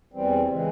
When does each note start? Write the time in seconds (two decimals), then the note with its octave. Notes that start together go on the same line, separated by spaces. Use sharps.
0.13 E2 E3 G3 C4
0.49 C#3 E3 G#3